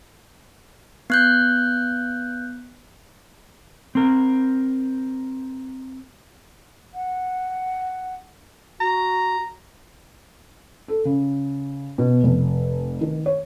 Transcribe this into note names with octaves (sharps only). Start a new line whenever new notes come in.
B3 F#6 G6
C4 A#4
F#5
F#4 A#5
A4
C#3
B2
F1
D#3
C#5